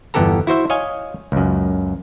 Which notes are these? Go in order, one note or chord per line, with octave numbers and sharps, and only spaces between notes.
G1 E2 B3 G4 A4 A#5
E4 F#4 C5 E5
C#5 D#5 F5 G#5
C#2 F#2